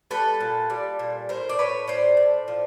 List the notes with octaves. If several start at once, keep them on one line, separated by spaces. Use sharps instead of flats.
G3 A4 B4
A#2
G3
A#2
A2 A#4 C5
D5
A2 B4 C#5
A2 C5 D5
A2
F3